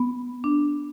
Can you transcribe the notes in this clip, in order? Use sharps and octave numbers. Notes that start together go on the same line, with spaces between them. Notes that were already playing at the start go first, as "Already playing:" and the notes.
Already playing: B3
D4